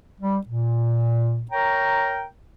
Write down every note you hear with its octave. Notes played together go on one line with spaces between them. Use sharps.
G3
A#2
A#4 C#5 G5 A#5